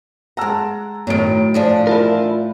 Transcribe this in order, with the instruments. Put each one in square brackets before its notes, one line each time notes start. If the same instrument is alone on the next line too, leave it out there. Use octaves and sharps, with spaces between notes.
[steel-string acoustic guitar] G#3 A#5 [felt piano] F#5 A5 E6
[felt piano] A2 D7 [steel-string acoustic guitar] D#3 F#3
[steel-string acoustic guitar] E3 F3 D4
[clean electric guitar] E4 F4 A#4